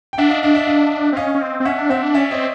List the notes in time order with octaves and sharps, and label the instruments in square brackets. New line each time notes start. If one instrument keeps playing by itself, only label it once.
[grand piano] G5
[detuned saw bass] D4 [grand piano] E5 F#5
[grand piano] D#5 F5
[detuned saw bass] D4 [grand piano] D#5 F5
[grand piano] D5 E5
D#5 F5
[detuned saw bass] C4
[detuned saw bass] C#4 [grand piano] D#5 F5
[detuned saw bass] C#4
C4
C4
[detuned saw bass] C#4 [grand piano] E5 F#5
[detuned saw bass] D4
[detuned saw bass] C4 [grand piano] E5 F#5
[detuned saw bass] D4
[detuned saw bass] C#4 [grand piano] D5 E5
[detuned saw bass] C4 [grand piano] C#5 D#5